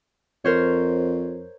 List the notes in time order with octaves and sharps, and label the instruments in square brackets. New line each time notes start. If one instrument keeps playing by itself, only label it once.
[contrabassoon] F2 [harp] A#4 C5 C#5